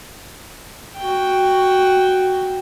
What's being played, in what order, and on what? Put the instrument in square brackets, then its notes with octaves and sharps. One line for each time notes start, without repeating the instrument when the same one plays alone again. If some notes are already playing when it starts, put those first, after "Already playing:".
[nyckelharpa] F#4 G5